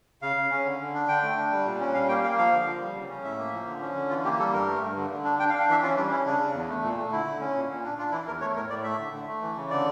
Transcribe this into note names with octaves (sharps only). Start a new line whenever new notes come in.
C#3 F5
C#3
C#4
D3
D3
D4
D3 G5
A3
D4
G3
A#2
C#4
G3 F5
A#3 G5
A#3 F5
F3 F5
D3
F3
G3
C#3
C#4
A2 E5
A#3
F3
D3
C#4
D3
E3 F4
A#3 G4
G3 A4
G2 A#4
A3
G2
D3
D3
D4
D4 G5
F5
D4
F5
E3 E5
C#4 F4
G3 D4
C#4 E4
C#3 D4
C#3
E2
A3
A#2
A3
D3 E4
D3
C#4
A#2
A#2
D4
D4 F4
E3 E4
E2 A#4
A3 C#5
A2 A#4
A2 D5
A3 E5
D3
D3
A3
E3
C#3
D3 D5